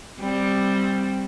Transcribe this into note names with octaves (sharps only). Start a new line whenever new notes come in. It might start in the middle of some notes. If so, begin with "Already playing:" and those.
G3 C4